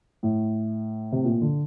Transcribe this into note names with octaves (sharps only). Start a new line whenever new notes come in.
A2
C3
A#2
D3